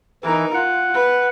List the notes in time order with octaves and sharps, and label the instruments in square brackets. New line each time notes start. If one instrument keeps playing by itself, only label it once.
[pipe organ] E3 [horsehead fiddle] D#4 A#4
[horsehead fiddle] F4 [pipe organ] F#5
[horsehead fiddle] B4